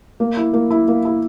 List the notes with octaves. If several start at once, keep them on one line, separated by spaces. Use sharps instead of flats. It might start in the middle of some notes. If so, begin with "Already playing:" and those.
A#3
E4
A#3
E4
A#3
E4